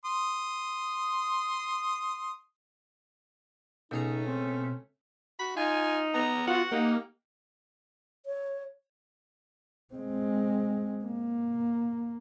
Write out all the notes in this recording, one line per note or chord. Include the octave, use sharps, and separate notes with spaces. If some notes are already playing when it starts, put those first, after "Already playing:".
C6 D#6
C#2 B2 A3 C#4 D#4 G#4 A#5
C4
F#4 B5
D#4 F4 G#5
B3 A#5
F4 F#4 F#5
A#3 D#4 G4
C#5
G#3 C4
A#3